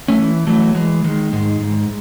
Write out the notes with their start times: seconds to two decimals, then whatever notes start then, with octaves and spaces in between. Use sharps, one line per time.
0.08 A3 C#4
0.19 E3
0.47 E3 F#3 A3
0.75 E3 G#3
1.04 D#3 G#3
1.32 G#2 G#3
1.60 G#2